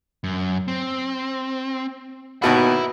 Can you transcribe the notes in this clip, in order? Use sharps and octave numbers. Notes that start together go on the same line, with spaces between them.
F#2
C4
D#2 B2 E5 F#5 B5